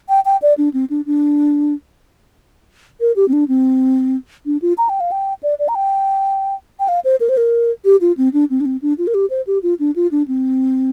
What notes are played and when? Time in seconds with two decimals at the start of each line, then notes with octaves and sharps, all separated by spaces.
0.09 G5
0.25 G5
0.42 D5
0.58 D4
0.74 C4
0.90 D4
1.06 D4
3.01 A#4
3.16 G4
3.28 C4
3.33 D4
3.48 C4
4.46 D4
4.62 F4
4.78 A#5
4.89 G5
5.00 F5
5.12 G5
5.43 D5
5.59 D5
5.68 A#5
5.75 G5
6.80 G5
6.88 F5
7.04 C5
7.20 A#4
7.29 C5
7.37 A#4
7.85 G4
8.01 F4
8.17 C4
8.33 D4
8.50 C4
8.60 D4
8.65 C4
8.82 D4
8.98 F4
9.07 A#4
9.14 G4
9.30 C5
9.47 G4
9.63 F4
9.80 D4
9.96 F4
10.11 D4
10.28 C4